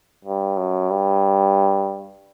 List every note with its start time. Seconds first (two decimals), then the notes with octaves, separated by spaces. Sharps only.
0.25 G2
0.57 F#2
0.90 G2